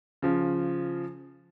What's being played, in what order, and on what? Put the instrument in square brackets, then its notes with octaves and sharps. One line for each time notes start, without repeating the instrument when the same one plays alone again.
[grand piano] C#3 F3